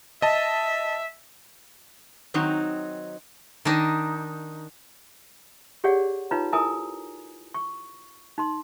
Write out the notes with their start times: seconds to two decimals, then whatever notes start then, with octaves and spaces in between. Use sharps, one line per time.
0.22 D#5 E5 A5
2.34 D#3 F#3 C4 D#4
3.65 D#3 D4 D#4
5.84 G4 G#4 C#5 D5 F#5
6.31 D#4 F4 B4 C#5 A#5
6.53 E4 A4 A#4 G#5 A#5 D#6
7.54 C#6
8.38 D#4 C6